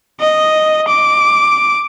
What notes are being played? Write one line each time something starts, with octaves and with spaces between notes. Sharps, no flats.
D#5
D6